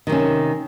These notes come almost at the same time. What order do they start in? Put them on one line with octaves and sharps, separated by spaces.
D#3 C3 C#4